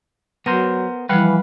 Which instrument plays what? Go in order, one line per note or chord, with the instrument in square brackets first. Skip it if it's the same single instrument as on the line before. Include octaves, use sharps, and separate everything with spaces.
[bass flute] F#3 [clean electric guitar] B3 A#4 C5 [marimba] A#6
[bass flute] E3 [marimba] F3 G3 [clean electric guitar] B4 F5 F#5